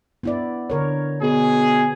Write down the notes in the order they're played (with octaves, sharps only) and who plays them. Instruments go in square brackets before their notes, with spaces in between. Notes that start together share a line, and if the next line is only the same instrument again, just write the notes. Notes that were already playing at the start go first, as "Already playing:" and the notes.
[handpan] B3 E4 D5
D3 A#4 C#5
[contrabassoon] B2 [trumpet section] G#4